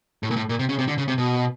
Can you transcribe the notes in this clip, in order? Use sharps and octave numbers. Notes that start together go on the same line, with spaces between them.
A2
A#2
A2
A#2
C3
C#3
C3
D3
C#3
C3
B2